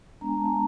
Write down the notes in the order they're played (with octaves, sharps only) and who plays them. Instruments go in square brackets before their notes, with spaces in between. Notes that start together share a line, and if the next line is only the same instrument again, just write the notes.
[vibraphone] G#3 B3 D4 A#5
G#5
A5
A#5